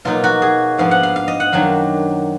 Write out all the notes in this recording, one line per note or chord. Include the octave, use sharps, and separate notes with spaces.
B2 F#3 A#3 D#4 F4
F#4
G#4
G#2 F3 B3 D4 F5
F#5
F5
F5
D#5
F#5
F#2 D#3 F#3 D4 F5